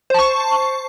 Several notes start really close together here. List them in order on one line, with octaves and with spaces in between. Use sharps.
C5 A5 C#6